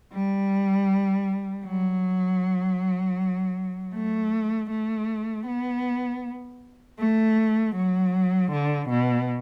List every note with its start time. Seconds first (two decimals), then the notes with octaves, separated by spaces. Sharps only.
0.13 G3
1.65 F#3
3.94 A3
4.70 A3
5.47 B3
6.99 A3
7.76 F#3
8.52 D3
8.90 B2